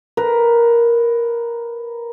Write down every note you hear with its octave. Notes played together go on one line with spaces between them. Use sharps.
A#4 B4